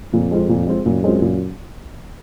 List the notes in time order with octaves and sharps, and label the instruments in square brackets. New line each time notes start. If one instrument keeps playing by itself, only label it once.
[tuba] F2 [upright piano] A#2
[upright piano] G#3 C4 F4
A#2
G#3 C4 F4
[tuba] F#2 [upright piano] A#2
[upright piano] G#3 C4 F4
A#2